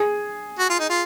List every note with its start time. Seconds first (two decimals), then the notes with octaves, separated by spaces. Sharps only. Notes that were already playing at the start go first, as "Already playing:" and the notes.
Already playing: G#4
0.59 F#4
0.70 F4
0.79 D#4
0.90 F4